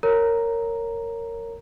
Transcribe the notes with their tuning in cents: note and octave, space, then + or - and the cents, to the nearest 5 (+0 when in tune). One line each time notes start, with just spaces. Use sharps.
A#4 -15 C#5 +0 A#5 +0